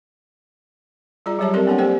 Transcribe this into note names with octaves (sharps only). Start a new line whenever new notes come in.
G3 F4 G#4 D5 A#5
F#3 G3 G4 C#5 E5 A5
C4 G4 A4 A#4 D5 C6
A#3 B3 D4 A4 C#5 F#5
G4 A4 C5 D5 F#5 G5